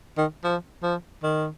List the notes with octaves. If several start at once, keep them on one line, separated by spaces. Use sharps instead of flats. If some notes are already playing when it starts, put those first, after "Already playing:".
D#3
F3
F3
D#3